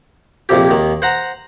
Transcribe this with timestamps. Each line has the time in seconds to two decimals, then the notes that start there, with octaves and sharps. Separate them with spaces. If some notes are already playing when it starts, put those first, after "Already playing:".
0.49 A#1 F2 C3 G4
0.71 D#2 D#3
1.02 C5 F#5 A#5